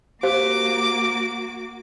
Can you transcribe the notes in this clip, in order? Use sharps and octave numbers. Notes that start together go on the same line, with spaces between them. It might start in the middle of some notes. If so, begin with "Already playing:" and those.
A#3 F#4 G4 C5 F5 D6